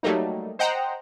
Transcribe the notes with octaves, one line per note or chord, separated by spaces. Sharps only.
F#3 G3 A3 A#3 D#4
C5 D#5 F#5 G5 A#5